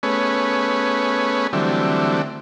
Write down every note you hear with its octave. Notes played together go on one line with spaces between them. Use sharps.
A3 B3 C#4 G#4 B4 C#5
D3 E3 F#3 G3 A3 C4